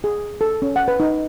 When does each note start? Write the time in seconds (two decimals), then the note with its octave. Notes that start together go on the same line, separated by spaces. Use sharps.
0.04 G#4
0.41 A4
0.62 C#4
0.76 F#5
0.88 B4
1.00 D#4